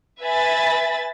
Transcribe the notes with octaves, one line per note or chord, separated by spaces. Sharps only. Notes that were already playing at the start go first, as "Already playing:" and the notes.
B4 E5 G#5 B5 A6